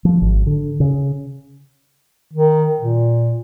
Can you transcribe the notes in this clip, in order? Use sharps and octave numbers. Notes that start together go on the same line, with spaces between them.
F3
G#1
D3
C#3
D#3
A#2